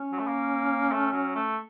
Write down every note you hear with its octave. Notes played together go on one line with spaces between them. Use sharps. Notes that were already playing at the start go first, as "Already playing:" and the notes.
Already playing: C#4
F#3
A3
A#3
A3
F#3
A3